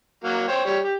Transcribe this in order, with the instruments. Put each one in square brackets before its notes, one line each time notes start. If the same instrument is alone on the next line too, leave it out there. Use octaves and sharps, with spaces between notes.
[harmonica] F#3 A#3 F#4
C5 C#5 G5
G3 C#5
G4